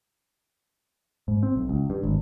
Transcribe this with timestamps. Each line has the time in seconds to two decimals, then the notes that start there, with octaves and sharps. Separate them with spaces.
1.28 G#2
1.43 C4
1.56 B1
1.69 C#2
1.90 G2
2.03 G#1